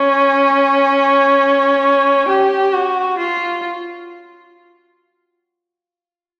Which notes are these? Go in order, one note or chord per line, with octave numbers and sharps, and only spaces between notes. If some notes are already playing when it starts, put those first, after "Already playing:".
Already playing: C#4
G4
F#4
F4